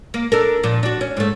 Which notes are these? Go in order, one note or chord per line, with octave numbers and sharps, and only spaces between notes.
A#3
D4 A4 A#4
A#2 F3
D4 F#4
C#4
G#2 A3